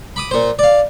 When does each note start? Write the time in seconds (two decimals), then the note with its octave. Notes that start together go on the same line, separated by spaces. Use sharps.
0.16 B5 D6 D#6
0.31 A#2 C5
0.59 D5 F5